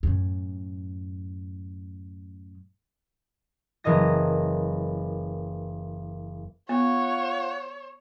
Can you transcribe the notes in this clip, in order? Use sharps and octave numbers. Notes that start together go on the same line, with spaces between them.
F#2 A2
F#1 E3 A#4 D#5 A#6
B3 F4 C#5 F#5